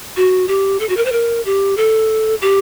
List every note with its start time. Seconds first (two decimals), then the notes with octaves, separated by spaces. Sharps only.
0.17 F#4
0.48 G4
0.80 A4
0.89 F#4
0.97 A#4
1.05 C5
1.12 A#4
1.46 G4
1.77 A4
2.42 G4